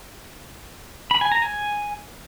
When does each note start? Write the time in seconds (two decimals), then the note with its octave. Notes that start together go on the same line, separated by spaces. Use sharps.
1.11 B5
1.21 G#5
1.32 A#5
1.42 G#5